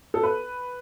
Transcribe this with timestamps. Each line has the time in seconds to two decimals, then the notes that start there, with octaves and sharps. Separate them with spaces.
0.14 A4
0.23 B4